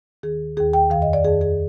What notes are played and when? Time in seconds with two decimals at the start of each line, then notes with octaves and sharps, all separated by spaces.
0.23 D#2 D#3 G#4
0.57 D#2 D#3 G#4
0.73 G5
0.90 F2 D#3 F5
1.02 D#5
1.13 D5
1.24 F2 D#3 G#4
1.41 G#4